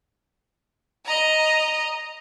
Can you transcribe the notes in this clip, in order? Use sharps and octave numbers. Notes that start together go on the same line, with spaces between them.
D#5 A#5